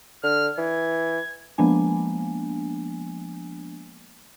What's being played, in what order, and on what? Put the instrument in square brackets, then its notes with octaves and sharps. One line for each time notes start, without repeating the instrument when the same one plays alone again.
[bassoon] D3 [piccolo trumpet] F6
[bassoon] E3 [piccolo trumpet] G#6
[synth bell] F3 G#3 A#3 B3 D4 G#5